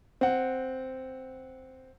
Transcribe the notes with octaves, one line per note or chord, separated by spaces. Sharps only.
C4 F#5